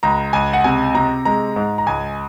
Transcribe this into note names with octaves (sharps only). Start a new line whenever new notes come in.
C#2 A#5
C#2 G#5
F#5
C3 G#5
C3 A#5
G#3 A#5
G#2
A#5
C#2 G#5